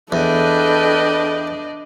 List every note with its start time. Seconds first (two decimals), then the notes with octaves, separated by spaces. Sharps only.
0.12 E2 D4 A4 B4 D5 D#5 G5